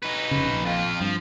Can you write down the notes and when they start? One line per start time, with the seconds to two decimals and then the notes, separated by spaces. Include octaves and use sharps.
0.03 D#4 B4
0.31 F1 C#3
0.48 A#1
0.64 F2 F4
1.01 G2 F3